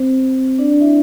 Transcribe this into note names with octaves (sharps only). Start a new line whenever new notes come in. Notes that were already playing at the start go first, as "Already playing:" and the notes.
Already playing: C4 C5
D4 D5
D4 D5
E4 E5